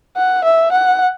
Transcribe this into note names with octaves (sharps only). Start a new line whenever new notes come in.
F#5
E5
F#5